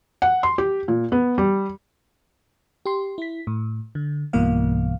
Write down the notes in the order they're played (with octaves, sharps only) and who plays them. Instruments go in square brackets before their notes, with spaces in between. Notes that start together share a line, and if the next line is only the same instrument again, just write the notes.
[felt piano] F#5
C6
G4
A#2
B3
G3
[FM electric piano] G4 C6
E4 B6
A2
D3
B1 G2 B2 E3 A#3 F5